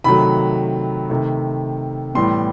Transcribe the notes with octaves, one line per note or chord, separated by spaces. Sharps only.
C3 D#3 F#3 A3 B5
C3 D#3 A3
A2 E3 G3 B3 C6